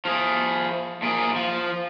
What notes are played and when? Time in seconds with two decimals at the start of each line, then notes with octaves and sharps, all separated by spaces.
0.05 F3 G#4
1.02 A#2 G#4
1.36 F3